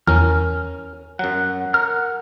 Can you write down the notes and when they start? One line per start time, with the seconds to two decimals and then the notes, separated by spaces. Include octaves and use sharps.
0.07 E2 C#4 A#4 F6
1.19 F#2 F#3 F#5
1.74 A#4 F#5 F6